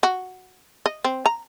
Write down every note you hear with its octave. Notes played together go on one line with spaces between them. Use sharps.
F#4
D#5
C4
A#5